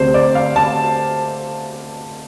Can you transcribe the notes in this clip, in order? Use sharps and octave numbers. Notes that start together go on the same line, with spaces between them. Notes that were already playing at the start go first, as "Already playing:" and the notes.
Already playing: D2 C3 C5
D5
F5
A5